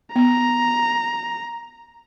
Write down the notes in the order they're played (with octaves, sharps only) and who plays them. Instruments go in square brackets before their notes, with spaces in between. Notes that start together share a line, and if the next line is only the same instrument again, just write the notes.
[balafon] B3 [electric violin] A#5